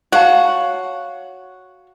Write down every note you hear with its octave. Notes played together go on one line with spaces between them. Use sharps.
F#4 C#5 F5 A5